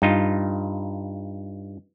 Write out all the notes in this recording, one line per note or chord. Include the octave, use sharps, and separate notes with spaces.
G2 D#4 F4